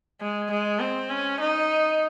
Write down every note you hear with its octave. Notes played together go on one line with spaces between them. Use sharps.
G#3
G#3
C4
C#4
D#4